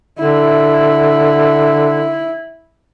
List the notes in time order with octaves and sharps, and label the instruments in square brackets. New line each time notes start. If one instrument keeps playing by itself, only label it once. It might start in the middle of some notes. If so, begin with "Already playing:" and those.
[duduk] D3 [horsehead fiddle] E4